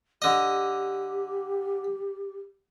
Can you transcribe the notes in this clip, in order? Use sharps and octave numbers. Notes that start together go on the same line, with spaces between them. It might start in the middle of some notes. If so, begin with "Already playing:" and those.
D3 G4 D#5